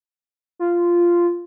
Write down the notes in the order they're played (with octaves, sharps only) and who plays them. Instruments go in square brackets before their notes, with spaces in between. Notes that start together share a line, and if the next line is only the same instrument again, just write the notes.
[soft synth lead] F4